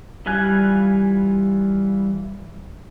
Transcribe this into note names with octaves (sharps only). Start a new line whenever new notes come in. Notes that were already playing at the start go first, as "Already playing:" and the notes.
E3 G3 F4 G#5 F#6